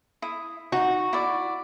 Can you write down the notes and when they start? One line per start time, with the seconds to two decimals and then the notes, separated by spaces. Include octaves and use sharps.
0.22 E4 D#6
0.72 D#4 F#4
1.13 E4 D5